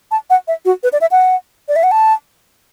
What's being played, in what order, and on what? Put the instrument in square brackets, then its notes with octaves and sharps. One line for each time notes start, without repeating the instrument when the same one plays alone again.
[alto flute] A5
F#5
E5
F#4
B4
D5
E5
F#5
D5
E5
F#5
A5